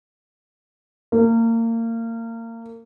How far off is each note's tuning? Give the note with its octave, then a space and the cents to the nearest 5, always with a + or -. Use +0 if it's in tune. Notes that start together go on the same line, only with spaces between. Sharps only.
A#3 -30